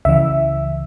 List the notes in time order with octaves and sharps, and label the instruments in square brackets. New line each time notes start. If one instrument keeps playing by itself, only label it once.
[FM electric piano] C#2 C#3 E3 E5